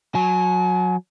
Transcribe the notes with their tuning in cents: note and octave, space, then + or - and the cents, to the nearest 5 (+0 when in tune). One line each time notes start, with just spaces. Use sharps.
F#3 -20 G#5 +35